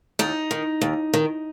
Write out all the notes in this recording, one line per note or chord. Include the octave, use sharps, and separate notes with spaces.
D#2 D#4
D#3
D#2
D#3